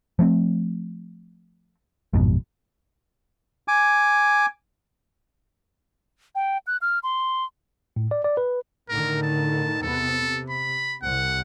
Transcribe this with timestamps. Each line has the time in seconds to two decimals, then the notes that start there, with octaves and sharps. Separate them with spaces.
0.19 F3 A3 B3 C4
2.13 A1 F2 G#2 B2
3.68 G#5 D6
6.35 G5
6.67 F#6
6.82 F6
7.03 C6
7.96 A2
8.11 D5
8.24 D5
8.37 B4
8.89 A2 D3 D#3 A#4
9.23 A5
9.83 E2 C3 B3 A4
10.19 C3
10.50 B5
11.02 C2 C3 F#5